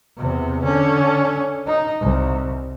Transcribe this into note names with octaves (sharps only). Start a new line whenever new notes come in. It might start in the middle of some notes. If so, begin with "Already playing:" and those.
E2 C3
D3 C#4
D#4
C2